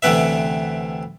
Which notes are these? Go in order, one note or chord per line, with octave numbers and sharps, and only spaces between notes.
D2 C3 E3 B3 B4 E5